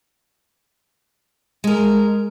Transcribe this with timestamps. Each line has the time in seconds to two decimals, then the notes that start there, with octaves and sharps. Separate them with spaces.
1.64 G#3 A#4